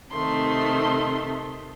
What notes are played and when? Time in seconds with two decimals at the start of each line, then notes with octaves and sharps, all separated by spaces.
0.11 C3 D#3 A3 C6